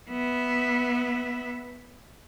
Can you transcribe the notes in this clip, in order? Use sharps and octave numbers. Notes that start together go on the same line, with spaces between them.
B3 E5